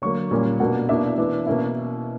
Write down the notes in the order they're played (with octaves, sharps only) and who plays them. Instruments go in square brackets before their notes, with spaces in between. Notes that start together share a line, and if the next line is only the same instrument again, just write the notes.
[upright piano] D3 F#3 A#3 C#5 C#6
A#2 G3 A#3 C#4
B2 A#3 D4 F#4 F#5
B2 A#3 D4 E4 E5
E3 B3 D4
B2 A#3 C#4 E4 E5